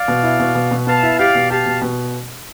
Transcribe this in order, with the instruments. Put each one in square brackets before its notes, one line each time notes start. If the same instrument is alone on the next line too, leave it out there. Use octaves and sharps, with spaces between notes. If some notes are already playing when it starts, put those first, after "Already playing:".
Already playing: [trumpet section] D5 F5
[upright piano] B2
E4
B2
B2
B2
[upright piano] B3 [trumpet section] F5 A5
[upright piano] E4
[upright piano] G4 [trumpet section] D5 F5
[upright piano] B2
[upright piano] G4 [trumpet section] F5 A5
[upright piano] B2
B2